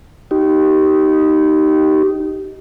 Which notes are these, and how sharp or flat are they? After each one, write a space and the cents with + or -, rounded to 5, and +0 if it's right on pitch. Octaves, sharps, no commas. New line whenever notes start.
D#4 +0 G4 -25